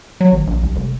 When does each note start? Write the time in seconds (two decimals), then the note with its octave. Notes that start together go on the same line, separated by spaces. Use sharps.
0.21 F#3
0.32 G#1
0.47 A#1
0.63 C2
0.76 F1